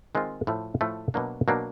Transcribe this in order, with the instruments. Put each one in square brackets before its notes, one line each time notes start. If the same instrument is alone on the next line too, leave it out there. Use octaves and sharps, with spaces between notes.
[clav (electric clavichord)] D#3 G#3 C4 F4
A2 F3 A3
A2 F3 A3
B2 F#3 A#3 D4
B2 F#3 A#3 D4